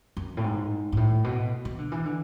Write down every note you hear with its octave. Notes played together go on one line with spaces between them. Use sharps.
F#2
A2
G#2
G#2
A2
B2
E3
D3
E3
D3